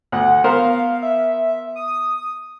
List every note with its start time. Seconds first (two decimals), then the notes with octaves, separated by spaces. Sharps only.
0.12 D2 F#5
0.44 B3 A#4 C5 F5
1.02 E5
1.76 D#6